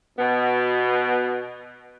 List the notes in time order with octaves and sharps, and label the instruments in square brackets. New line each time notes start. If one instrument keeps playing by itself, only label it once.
[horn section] B2 B3